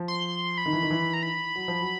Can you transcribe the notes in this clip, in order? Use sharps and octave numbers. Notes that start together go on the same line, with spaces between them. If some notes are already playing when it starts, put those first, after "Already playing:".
Already playing: F3
C6
B5
D#3
E3
D#3
E3
A#5
B5
F#3
F3
F#3